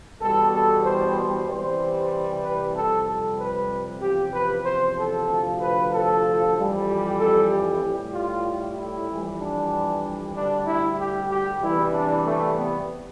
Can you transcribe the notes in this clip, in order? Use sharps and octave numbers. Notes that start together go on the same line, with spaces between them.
E2 B2 G3 A4
A4
C5
C2 C3 E3 G3 C5
B4
F2 C3 G3 A4
A4
B4
E2 C3 F3 G4
B4
C5
A4
D2 C3 F3
B4
A4
F2 E3 G3
G4
A4
G4
A2 G3
F4
E4
F2 E3 G3
D4
D2 D3 G3 D4
E4
G4
G4
E2 C3 E3 G3 E4
D4
A3
B3